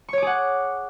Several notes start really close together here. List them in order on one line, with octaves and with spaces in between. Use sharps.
C#6 C#5 D6 G#4 F#5